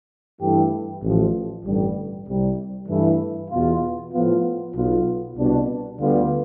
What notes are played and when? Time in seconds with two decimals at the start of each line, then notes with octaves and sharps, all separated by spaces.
0.40 G2 E3 A3 E4 G4
1.02 A1 A2 F3
1.64 A1 G2 D3 G3
2.27 C2 C3 G3
2.88 G2 E3 A3 E4
3.50 E2 B2 B3 F4
4.13 A2 F3 B3 F4
4.75 B1 B2 B3 F4
5.37 C2 B2 G3 D4
5.99 D2 D3 G3 B3 F4